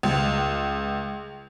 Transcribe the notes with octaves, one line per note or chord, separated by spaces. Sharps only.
C#2